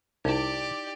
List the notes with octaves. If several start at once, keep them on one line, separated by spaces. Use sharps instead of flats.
C2 D#4 E4 G4 D5 A5